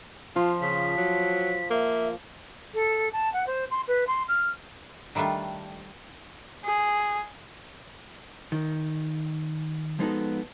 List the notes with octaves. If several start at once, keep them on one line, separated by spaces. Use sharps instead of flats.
F3 F4
C#3 B6
F#3
A#3 E5
A4
A5
F#5
C5
C6
B4
C6
F6
D#3 G3 A3 D4 F4
G#4
D#3
F3 G#3 B3 D#4 F#4 A4